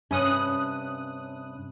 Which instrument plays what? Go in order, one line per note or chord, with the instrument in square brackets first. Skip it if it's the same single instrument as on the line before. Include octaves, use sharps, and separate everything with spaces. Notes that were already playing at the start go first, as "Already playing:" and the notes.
[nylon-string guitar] G2 C3 [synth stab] C#4 D#6 F#6